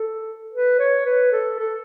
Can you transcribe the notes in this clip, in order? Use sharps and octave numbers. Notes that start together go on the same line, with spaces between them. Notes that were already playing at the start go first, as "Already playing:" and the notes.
Already playing: A4
B4
C#5
B4
A4
A4